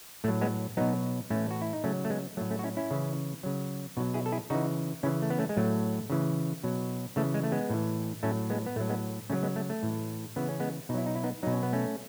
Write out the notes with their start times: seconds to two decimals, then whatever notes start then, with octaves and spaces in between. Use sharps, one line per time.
0.24 A2 A3
0.28 F#3
0.41 G#3 B3
0.77 B2 F#3 B3 D#4
1.30 A2 E3 A3 C#4
1.51 F#4
1.62 E4
1.73 D#4
1.84 C#3 F#3 A3 C#4
2.05 A3
2.10 G#3 B3
2.37 F#3 A3
2.41 A2
2.50 A3 C#4
2.59 F#4
2.64 C#4 E4
2.77 C#4 E4
2.91 C#3 E3
3.43 C#3 F#3
3.97 B2 D#4 F#4
4.00 F#3
4.14 E4 G#4
4.26 A4
4.32 E4 G#4
4.50 C#3 E3 D#4 F#4
5.03 C#3 E3 C#4 E4
5.22 A3
5.30 B3
5.38 A3 C#4
5.49 G#3
5.57 A2 F#3 A3
6.10 C#3 E3
6.64 B2 F#3
7.16 C#3 E3 A3
7.34 G#3
7.43 A3
7.52 G#3 B3
7.70 A2 E3
8.23 A2 F#3 A3 C#4
8.50 G#3 B3
8.66 B3
8.76 A2 A3
8.80 F#3
8.89 G#3 B3
9.30 C#3 F#3 A3 C#4
9.43 G#3 B3
9.56 A3
9.70 A3
9.83 A2 E3
10.36 C#3 E3 B3
10.49 C#4
10.60 G#3 B3
10.89 B2 D#4
10.94 F#3 E4
11.06 D#4
11.15 E4
11.24 B3 D#4
11.43 B2 F#3 D#4
11.53 C#4
11.63 B3
11.73 A3 C#4